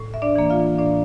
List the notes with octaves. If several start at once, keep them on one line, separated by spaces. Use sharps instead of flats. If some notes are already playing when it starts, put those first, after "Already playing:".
Already playing: A2
E5
D4 D5
E3 A#3
F4 F5
A2 D4 D5